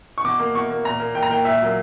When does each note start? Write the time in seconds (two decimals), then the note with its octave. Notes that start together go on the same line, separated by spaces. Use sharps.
0.18 C#6
0.24 B2 D6
0.39 A#3
0.54 B2 C#6
0.70 A#3
0.85 A#2 A#5
1.00 A#3
1.15 A#2 G5
1.23 A#5
1.30 A#3 G5
1.45 A#2 E5
1.60 F#3 A#3